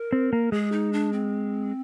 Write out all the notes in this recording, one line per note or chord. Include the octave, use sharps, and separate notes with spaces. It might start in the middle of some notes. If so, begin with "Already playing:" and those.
Already playing: A#4
C4
A#3
G#3 G#4
D#4
D4
C4